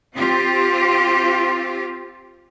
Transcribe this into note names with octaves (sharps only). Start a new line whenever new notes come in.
C4 F4 G4